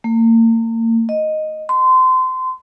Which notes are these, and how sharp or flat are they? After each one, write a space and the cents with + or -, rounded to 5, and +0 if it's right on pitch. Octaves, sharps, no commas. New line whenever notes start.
A#3 -40
D#5 -5
C6 -25